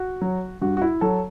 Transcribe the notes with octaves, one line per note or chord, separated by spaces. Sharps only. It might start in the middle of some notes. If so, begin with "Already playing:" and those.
Already playing: F#4
F#3
G2 F#4
F#4
E4
F#3 A4